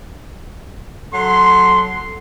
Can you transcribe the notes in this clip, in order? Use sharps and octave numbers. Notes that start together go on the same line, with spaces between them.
F#3 A4 C6